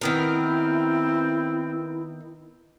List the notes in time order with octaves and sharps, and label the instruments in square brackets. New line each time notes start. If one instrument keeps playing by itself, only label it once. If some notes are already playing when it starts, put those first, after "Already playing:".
[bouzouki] D#3 B3 A#4 [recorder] C4 [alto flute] E4